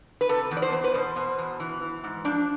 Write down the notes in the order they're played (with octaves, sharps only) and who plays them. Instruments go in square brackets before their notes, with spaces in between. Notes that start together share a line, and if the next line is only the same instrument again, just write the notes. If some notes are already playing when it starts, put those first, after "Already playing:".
[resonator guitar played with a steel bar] B4
C3 A4
E2
D5
C5
E2
B4
B2 C5
B2
E2
E3
E3
G#2
F3 D4